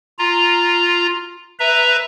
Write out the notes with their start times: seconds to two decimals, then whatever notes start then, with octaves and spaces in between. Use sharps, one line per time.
0.19 F4 A#5
1.60 B4 E5 A#5